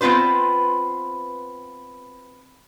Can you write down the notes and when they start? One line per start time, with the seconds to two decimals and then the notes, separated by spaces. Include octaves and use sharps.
0.01 B3 C4 F4 B4 C5